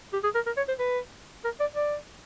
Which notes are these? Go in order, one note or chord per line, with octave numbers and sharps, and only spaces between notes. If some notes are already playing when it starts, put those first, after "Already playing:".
G4
G#4
A#4
A#4
C#5
C5
B4
A#4
D5
D5